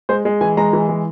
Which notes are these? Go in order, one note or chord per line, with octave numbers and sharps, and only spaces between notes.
G#3 C5
G#3
E3 G#5
G#3 A#5
E3
G#3